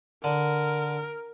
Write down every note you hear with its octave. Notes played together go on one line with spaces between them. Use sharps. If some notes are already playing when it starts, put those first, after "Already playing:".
D3 A#4